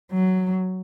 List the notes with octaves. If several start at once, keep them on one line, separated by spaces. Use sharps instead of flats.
F#3